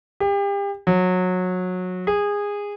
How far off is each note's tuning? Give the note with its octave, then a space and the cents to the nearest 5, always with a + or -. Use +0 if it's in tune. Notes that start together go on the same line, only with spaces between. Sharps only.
G4 +35
F#3 -20
G#4 -20